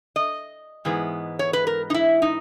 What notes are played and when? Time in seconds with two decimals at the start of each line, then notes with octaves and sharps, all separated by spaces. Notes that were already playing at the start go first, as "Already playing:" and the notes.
0.16 D#5
0.85 G#2 E3 G#3 B3
1.39 C#5
1.53 B4
1.67 A#4
1.90 D#4
1.94 E4
2.22 D#4